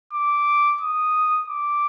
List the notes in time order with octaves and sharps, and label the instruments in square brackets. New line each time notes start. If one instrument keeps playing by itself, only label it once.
[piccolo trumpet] D6
D#6
D6